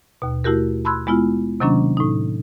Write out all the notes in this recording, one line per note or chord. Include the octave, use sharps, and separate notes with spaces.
D#2 B2
A3 E4 F#4 G4 A#4
A5 B5 C6 E6 F#6 G#6
G#3 B3 E4 F4
C3 D#3 F#3 A#3 C#4 D4
A2 D#4